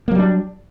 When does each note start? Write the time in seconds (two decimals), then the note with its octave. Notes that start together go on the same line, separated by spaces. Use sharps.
0.08 A#3
0.11 F#3
0.15 G3
0.19 D4